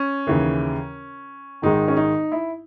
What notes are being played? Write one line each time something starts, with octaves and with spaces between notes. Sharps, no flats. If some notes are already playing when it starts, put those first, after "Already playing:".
Already playing: C#4
D#2 C#3 E3
G#1 G#2 D#3 G#3 D#4
C#4
D#4
E4